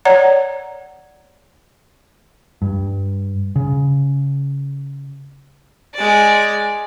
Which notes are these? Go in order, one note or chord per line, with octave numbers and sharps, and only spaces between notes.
C#5 D5 F#5 A#5
G2
C#3
G#3 D5